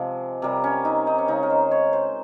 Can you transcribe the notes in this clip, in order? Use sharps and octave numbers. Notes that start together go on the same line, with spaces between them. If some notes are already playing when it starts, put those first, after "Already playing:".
Already playing: C3 F3 G#3
C3 G3 A#4
C#4
D#4
D#4
C#4
C#3 G#3 D#4
A#4
C5
C#5
C5